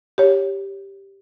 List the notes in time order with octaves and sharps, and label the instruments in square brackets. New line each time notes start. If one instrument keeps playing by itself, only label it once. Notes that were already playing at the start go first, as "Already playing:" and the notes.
[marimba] G4 C#5